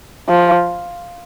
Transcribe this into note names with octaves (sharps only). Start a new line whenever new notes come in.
F3